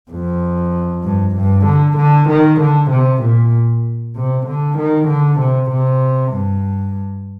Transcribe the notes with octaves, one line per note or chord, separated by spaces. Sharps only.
F2
G2
G2
D3
D3
D#3
D3
C3
A#2
C3
D3
D#3
D3
C3
C3
G2